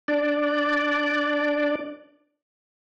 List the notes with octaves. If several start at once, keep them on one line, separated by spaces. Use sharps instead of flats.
D4 D5